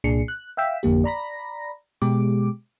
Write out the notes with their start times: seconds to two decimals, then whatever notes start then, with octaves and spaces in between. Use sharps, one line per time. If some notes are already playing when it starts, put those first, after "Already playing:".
0.04 C2 A#2 D4 G#4 C7 C#7
0.28 F#6
0.57 E5 F5 G5 E6 B6
0.83 G#1 F2 D3 A#3 G4
1.04 D5 A#5 B5 A#6
2.02 B2 G#3 G4 D6